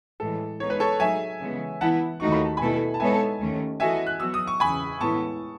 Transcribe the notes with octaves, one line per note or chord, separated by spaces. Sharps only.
A2 E3 G#3 A4
G#3 B3 D#4 C#5
B4
A4 C#5
F#3 A3 D#4 G#4 E5 G#5
C#3 E3 G#3 B3
E3 B3 E4 F#5 A5
D#2 D#3 A3 D#4 F#4 C#6
B5
A5
B2 A3 E4 A4 G#5 B5
A5
G#3 B3 D#4 A4 C#5 E5 G#5
D#2 D#3 A3 C#4
E3 B3 F#4 A4 D#5 E5 G#5
F#6
F#3 B3 F#4 E6
D#6
C#6
E2 C#3 E3 G#5 B5
A2 E3 G#3 B3 E4 A5 C#6